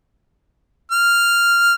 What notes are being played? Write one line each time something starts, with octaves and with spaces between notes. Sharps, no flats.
F6